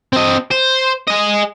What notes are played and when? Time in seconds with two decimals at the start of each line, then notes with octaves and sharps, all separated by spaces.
0.13 C4 D#5
0.51 C5
1.07 G#4 D#5